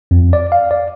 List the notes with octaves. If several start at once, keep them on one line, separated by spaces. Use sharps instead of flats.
F2
D5
F5
D5